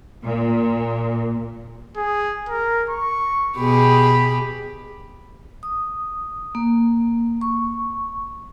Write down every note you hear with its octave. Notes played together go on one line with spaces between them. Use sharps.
A#2
G#4
A#4
C#6
B2 G4 G#4 B5
D#6
A#3
C#6